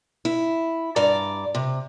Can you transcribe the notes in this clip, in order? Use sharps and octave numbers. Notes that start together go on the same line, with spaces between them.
E4
G2 D5 A#5
C3